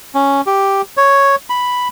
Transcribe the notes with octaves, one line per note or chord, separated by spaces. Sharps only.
C#4
G4
C#5
B5